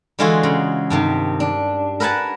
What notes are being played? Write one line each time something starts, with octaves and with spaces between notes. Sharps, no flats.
D3 E3 G#3 F4 F#4 G#4
C#3
G2 C3 D#3
D4
A#4 B4 F#5 G#5 A5